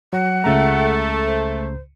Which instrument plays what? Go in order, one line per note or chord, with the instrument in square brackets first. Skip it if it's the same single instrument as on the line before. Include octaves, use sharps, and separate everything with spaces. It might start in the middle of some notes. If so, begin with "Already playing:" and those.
[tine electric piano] F#3 [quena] F#5
[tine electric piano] C#2 C#3 A#5 [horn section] A3
[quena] C5